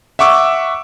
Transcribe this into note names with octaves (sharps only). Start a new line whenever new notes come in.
E5 F#5 C#6 D6 E6